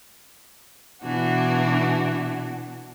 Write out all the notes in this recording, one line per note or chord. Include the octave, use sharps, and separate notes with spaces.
B2 E3 D4 F#4